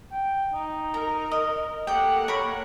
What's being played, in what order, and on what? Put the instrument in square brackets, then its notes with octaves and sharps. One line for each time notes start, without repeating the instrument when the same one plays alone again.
[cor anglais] G5
D#4
[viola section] A#4 [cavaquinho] A#5
[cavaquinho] D#5
[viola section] A#3 A4 F#5 [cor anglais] G4 [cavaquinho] G5
[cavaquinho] A#4 B5 [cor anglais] C#5